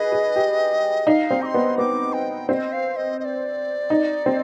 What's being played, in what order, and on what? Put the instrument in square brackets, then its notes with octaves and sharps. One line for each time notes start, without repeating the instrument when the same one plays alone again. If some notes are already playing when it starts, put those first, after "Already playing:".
Already playing: [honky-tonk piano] G#4 B4 [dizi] D#5
[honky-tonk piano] G#4
G4
[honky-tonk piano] D#4 [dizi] F5
[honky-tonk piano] C4
[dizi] D6
C6
[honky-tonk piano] B3
[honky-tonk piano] B3 [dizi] D6
[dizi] G5
[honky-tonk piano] C4 [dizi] F5
[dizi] D#5
F5
D#5
D#5
D5
[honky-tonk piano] D#4
C4